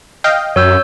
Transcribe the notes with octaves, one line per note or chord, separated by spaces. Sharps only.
D#5 F5 G5
F#2 C#5 E6 G6